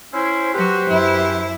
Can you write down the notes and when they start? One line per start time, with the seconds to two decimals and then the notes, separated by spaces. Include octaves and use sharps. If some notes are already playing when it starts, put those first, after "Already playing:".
0.13 C#4 E4 C5
0.54 F#3 F#4 G4 B4 C5
0.88 F#2 E4